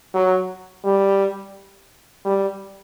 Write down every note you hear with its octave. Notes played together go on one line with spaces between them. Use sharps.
F#3
G3
G3